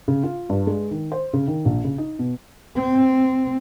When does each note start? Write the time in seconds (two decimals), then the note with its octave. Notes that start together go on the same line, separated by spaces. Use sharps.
0.08 C#3
0.24 F4
0.50 G2
0.67 G#3
0.91 D#3
1.12 C5
1.34 C#3
1.48 D#3
1.65 A#1
1.84 C#3
1.98 D#4
2.19 B2
2.76 C4